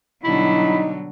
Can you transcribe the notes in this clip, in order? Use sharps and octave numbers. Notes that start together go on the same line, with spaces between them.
B2 D3 F#3 G3 D#4 E4